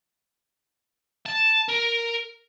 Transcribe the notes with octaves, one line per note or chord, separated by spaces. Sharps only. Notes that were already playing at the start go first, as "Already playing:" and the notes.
A5
A#4